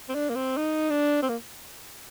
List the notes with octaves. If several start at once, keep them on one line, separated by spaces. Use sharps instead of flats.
C4
D4
A#3
C4
D#4
D4
C4
A#3